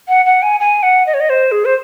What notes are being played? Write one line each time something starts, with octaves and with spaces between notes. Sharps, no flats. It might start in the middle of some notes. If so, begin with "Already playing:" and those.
F#5
F#5
G#5
G#5
F#5
D#5
C#5
D#5
C5
G#4
C5